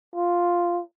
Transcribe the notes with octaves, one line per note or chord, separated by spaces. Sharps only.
F4